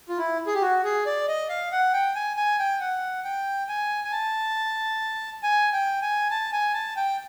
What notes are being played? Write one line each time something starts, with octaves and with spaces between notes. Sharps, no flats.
F4
E4
G#4
G4
F#4
G#4
D5
D#5
F5
F#5
G5
G#5
G#5
G5
F#5
G5
G#5
G#5
A5
G#5
G5
G#5
A5
G#5
A5
G5